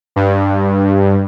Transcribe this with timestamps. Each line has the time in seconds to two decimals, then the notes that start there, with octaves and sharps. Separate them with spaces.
0.16 G2